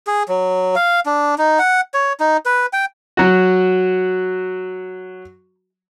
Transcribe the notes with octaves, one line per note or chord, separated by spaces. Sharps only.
G#4
F#3
F5
D4
D#4
F#5
C#5
D#4
B4
G5
F#3 F#4